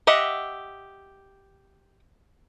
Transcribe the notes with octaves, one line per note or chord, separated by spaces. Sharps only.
G4 D#5 E5 F#5